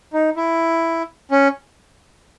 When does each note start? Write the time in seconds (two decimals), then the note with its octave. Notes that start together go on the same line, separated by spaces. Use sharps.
0.13 D#4
0.37 E4
1.31 C#4